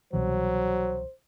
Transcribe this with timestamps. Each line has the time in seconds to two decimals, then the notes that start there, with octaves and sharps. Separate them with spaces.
0.13 C2 B2 E3 F#3 C5